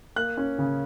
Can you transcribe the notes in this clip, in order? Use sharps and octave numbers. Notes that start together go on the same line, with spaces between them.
A#3 F#6
C#4
C#3